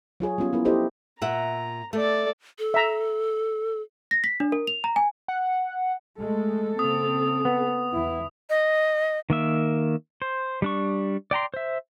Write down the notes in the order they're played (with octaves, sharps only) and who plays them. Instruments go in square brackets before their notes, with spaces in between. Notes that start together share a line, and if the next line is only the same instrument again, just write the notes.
[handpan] F#3 F4 G#4 C#5
G3 B3 C#4 F4
B3 E4 A#4
E4 G4 A4 C5 D5 D#5
[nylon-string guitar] A#2 E5 F#5 [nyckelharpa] A#5
[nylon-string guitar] A3 [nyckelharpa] A4 D5
[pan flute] A4
[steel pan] E5 A#5
[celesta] A#6
B6
D4
A#4
F7
A#5
G#5
[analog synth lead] F#5
[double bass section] G#3 A3 [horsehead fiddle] A4
[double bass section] C#3 A#3 C4 [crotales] D#6
[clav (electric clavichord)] B3
[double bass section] E2 E3 [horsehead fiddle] E4
[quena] D#5
[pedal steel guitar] D#3 A#3 E5
C5
G3 D4 C#6
D5 G5 A#5 C6
C5 E5